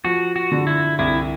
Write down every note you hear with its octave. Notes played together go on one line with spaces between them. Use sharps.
F3 F#4
F#4
D3
E4
C2 E4